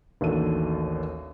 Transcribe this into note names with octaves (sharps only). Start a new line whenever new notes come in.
A1 D#2 D4 F#4 A4 D#7